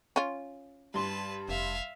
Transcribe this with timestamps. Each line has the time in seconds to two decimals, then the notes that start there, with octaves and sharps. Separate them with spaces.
0.16 C#4 F4
0.94 G2 B4 A5 C6
1.49 F1 E5 F5